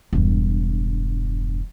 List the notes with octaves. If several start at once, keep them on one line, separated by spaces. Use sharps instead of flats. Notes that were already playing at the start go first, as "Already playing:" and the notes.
E1 G2